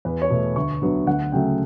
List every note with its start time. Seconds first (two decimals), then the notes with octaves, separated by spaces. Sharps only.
0.05 E2 B4
0.22 C#5
0.30 B2 A3
0.56 D2 C#6
0.82 D3 F#3 B3
1.07 D2 F#5
1.32 C#3 F#3 A3 G5